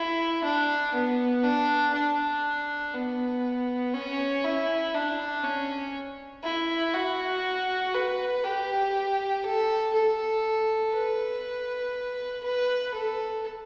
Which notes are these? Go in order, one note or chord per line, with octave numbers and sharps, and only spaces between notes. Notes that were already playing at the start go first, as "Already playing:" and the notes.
Already playing: E4
D4
B3
D4
D4
B3
C#4
E4
D4
C#4
E4
F#4
B4
G4
A4
A4
B4
B4
A4